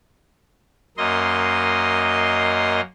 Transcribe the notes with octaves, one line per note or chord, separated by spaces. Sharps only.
F#2 A#3 D#5 C6